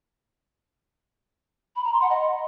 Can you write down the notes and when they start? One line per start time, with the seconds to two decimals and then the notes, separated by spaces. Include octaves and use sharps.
1.76 B5
1.84 A#5
1.93 C6
2.01 F#5
2.10 D#5